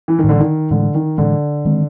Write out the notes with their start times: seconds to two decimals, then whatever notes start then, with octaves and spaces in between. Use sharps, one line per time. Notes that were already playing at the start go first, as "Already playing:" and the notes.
0.08 E3
0.19 D#3
0.24 A2 D3 E3 G#3
0.39 D#3
0.71 A2 D3 E3 G#3
0.94 D#3
1.18 A2 D3 E3 G#3
1.65 D#3 G#3 C4